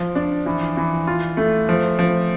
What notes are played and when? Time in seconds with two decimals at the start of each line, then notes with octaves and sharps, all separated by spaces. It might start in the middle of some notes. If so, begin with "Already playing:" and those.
Already playing: F3
0.15 D4
0.46 E3
0.77 E3
1.07 F4
1.37 A3
1.69 F3
1.99 F3